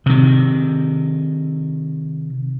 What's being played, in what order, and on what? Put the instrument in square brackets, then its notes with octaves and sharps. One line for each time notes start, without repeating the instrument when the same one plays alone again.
[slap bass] C3 D#3